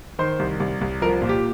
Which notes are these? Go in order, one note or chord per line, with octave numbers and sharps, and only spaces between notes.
D#3 C5
C2
C2
C2
F3 A#4
A#2
G4